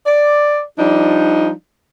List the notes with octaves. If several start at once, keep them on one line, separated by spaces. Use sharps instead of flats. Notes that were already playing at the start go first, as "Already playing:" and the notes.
D5
F3 G3 D4 D#4